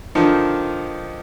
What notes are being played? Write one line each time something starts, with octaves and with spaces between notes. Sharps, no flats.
D3 D#3 F3 D4 D#4